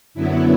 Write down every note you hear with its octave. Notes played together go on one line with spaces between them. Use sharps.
F#2 D3 F#3 B3 E4